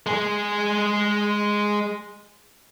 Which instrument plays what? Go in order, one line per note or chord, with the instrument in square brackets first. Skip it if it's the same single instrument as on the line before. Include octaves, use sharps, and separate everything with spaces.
[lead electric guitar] G#3 G#4